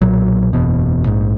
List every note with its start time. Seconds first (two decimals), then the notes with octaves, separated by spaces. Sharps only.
0.01 B1 A#2 F#3
0.53 F#1 E2 B2
1.06 A#1 G#2